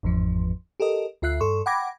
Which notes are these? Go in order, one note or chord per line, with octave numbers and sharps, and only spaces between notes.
G1 E2 G#2 F3
G4 A4 A#4 D#5
D2 F4 E5 F#6 C7
G2 A4 C6 C#6
F#5 G5 B5 D6 G#6 A#6